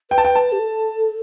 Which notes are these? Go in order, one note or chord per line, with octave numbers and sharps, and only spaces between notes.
B4 G5
A5
G5
A5
G4
A4